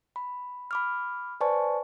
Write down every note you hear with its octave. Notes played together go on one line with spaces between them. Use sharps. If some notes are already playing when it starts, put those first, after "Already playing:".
B5
B5 D6 F6
B4 C5 D5 G#5 A5 C#6